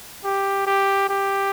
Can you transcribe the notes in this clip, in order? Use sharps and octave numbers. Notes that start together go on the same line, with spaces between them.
G4
G4
G4